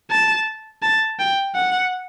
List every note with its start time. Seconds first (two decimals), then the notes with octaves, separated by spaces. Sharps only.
0.11 A5
0.82 A5
1.19 G5
1.55 F#5